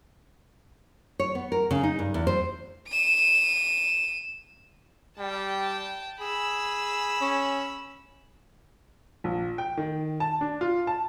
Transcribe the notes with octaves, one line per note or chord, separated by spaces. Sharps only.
C#5
B3
A#4
C#3
D#4
G2
E2
C5
D#7 E7
G3 G5 A5
G#4 B5 E6
C#4
A#1
G5
D#3
A5
D4
F4
A5